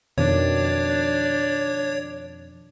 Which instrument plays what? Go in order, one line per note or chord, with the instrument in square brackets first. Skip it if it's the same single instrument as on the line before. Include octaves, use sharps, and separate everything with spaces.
[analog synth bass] F2 [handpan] B2 D#3 [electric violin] D4 [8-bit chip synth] C#5